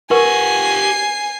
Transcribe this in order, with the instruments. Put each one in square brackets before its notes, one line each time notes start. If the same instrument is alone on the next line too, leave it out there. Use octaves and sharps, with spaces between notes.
[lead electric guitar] G4 F#5 [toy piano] A#4 B4 C#6 [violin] G#5 C7